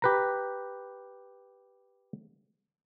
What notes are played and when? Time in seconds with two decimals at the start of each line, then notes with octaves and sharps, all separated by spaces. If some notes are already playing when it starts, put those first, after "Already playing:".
0.02 G4 B4 A#5